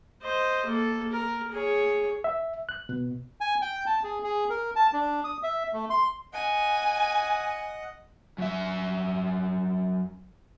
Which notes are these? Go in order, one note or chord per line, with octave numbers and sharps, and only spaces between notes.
C5 D#5
A#3 A4
A#4
G#4 C#5
E5
F#6
B2
G#5
G5
A5
G#4
G#4
A#4
A5
D4
D#6
E5
A3
C6
D#5 F#5 G#5
F#2 E5